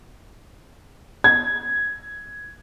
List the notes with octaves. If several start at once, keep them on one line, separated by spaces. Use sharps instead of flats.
G#6